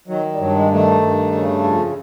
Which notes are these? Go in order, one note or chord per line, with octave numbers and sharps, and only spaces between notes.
D#3 F#3
G3
G2 F#3
G#3
D#3 A3
G2
C#3
F2